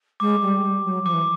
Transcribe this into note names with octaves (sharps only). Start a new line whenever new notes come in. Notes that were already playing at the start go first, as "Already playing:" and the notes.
G#3 D6
G3
G3
F#3
F3 D6
E3